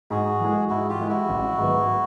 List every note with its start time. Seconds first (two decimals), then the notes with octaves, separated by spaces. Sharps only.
0.10 G#2 F#4 G#4
0.40 E3 G#3
0.69 G#2 E4 F#4
0.89 F4 G4
0.99 E3 G#3
1.09 E4 F#4
1.29 A1
1.58 G#2 D#3 F#3 B3